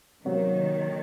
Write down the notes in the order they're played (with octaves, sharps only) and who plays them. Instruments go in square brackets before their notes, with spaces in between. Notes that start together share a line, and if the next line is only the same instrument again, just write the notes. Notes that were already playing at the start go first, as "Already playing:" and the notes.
[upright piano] C3 F#3 A#3 [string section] D#3